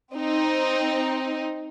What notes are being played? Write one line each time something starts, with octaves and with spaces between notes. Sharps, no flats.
C4 D#4